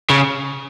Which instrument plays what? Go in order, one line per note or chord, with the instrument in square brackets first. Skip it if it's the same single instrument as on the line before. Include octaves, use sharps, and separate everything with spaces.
[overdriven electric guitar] C#3